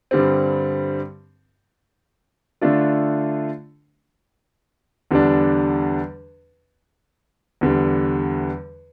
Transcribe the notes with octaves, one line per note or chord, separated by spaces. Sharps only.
G2 D3 G3 C4
D3 A3 D4 F4
E2 D3 G3 D4
E2 D3 G3